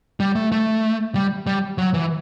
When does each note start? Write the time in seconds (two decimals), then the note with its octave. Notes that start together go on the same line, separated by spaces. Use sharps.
0.20 G3
0.35 A3
0.52 A3
1.15 G3
1.47 G3
1.78 F#3
1.94 E3